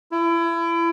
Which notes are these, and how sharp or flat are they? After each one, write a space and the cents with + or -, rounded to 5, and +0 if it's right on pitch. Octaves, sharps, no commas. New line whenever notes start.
E4 +30